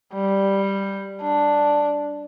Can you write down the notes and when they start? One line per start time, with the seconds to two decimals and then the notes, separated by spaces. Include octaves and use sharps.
0.13 G3
1.22 D4